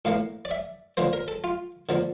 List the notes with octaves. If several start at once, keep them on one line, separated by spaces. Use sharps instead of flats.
A2 E3 A#3 F5
D5
E5
D3 F3 A#3 C5
A#4
A4
F4
D3 F3 A#3